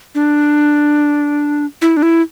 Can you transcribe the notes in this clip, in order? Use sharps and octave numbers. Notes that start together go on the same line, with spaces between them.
D4
E4
D4
E4